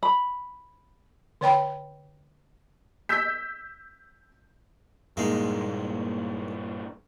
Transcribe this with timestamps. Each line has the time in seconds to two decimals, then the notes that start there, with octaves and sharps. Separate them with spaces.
0.03 B5
1.41 D3 C#5 G5 B5
3.09 E6 G6 B6
5.17 G2 A#2 G#3 A#3 D#4